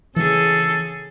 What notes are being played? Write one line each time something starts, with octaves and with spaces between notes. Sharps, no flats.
C#3 E3 G#4 A4